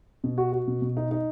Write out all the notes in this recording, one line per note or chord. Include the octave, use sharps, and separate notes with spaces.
B2
F#4
F#4
B2
B2
D#4
D#4